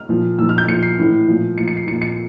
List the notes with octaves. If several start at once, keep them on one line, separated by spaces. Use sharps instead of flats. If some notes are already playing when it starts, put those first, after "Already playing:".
Already playing: F6
A#2 F3
A#2 F3 E6
F6
G6
A#2 F3 C#7
C7
A2 E3
A#2 F3
A#2 F3 C#7
C#7
C7
A#2 F3 C#7
C#7